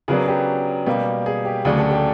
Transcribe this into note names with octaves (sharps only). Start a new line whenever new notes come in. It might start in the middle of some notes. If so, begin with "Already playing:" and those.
C#3 F#3 B3 D4 G#4 A#4
G4
B2 G3 A#3
G#4
G4
D2 C#3 F#3 A3 D4 G#4
G4 A4
G4 A4